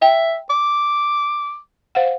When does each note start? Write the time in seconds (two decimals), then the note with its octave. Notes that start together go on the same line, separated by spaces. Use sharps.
0.02 E5 G5
0.50 D6
1.95 C5 F5 F#5